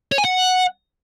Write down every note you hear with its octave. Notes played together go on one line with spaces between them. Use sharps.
C#5
G#5
F#5